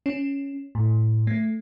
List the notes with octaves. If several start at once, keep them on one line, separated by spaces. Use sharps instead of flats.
C#4
A2
A3